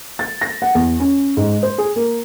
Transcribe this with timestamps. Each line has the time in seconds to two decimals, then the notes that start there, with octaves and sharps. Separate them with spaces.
0.19 A6
0.41 A#6
0.62 F#5
0.75 E2
1.00 C#4
1.37 G#2
1.63 C5
1.78 G#4
1.96 A#3